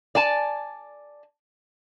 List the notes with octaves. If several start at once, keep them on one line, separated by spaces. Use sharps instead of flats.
D5 G#5 A5